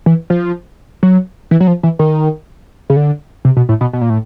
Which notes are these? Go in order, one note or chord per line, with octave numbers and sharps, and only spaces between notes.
E3
F3
F#3
E3
F#3
F3
E3
D#3
C#3
D3
C3
B2
A2
B2
B2
A#2
A2